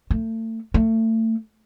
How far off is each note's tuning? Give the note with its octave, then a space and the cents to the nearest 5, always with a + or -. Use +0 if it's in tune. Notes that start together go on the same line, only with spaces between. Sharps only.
A3 +35
A3 +30